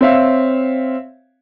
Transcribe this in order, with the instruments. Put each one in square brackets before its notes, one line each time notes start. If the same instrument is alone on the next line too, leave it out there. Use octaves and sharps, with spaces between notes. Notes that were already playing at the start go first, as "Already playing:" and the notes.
[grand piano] C4 C#5 E5 F5